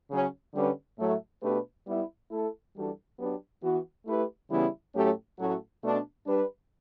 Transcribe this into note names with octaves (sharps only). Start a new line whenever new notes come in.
C#3 F#3 C#4
D3 G3 C#4 G4 B4
A2 F#3 A3
B2 A3 D4 G4 B4
G3 B3 E4
A3 E4 A4
E3 G3 D4 F#4 A4
F#3 B3 D4 G4 B4
E3 B3 F#4
A3 E4 G4 B4
C#3 E3 G3 B3 E4
A2 F#3 A3 C#4 G4
A2 F#3 A3 C#4 F#4
B2 A3 D4
G3 D4 G4 B4